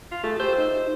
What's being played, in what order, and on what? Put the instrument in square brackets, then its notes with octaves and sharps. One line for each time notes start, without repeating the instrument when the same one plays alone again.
[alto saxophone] F4
[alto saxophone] A3 [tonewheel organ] F4 G#4 A5
[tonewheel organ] G4 E6 G6 [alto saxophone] C5
[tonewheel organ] D#4